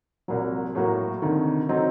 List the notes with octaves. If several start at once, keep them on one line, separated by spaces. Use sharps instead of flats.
C2 A#2 F#3
A2 F#3 A#3 F#4
D2 C3 D#3
F#3 C4 D#4 A4